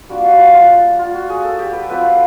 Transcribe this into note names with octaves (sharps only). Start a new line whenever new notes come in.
G3 A#3 D4 F4 F#4
F#4
F#4
F4
F4
F#4
G#4
A4
G4
B4
F#3 A3 C4 F4 B4